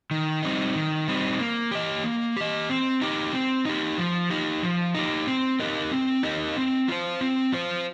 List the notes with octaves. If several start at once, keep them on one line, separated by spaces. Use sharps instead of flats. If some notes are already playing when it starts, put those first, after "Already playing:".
D#3
G3 C4 D#4
D#3
G3 C4 D#4
A#3
G4 D#5
A#3
G4 D#5
C4
D#4 G4
C4
D#4 G4
F3
D#4 G4
F3
D#4 G4
C4
D#4 G4 A#4 D#5
C4
D#4 G4 A#4 D#5
C4
F4 C5
C4
F4 C5